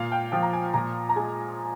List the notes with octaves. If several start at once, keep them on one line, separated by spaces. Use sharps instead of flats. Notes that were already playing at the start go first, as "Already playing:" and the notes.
Already playing: A#2 F5
G5
F3 G5
A#5
G#5
A#2 A#5
A#5
G#3 G#5